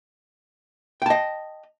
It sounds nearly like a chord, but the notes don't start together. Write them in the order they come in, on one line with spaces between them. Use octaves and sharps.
G5 A5 D#5